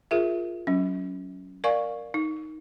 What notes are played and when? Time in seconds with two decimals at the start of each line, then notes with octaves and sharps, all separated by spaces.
0.11 F4 G#4 A#4 E5
0.67 F#3 C#4
1.64 A#4 D5 F5 G#5 C#6
2.14 D#4